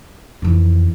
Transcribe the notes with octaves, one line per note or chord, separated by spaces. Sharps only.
F2 D#3 E3